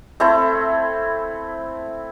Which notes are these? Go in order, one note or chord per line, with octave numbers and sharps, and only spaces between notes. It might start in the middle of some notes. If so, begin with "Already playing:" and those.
A3 C4 E4 A4